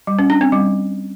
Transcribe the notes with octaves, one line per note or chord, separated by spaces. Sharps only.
G3
C#4
D4
C4
G3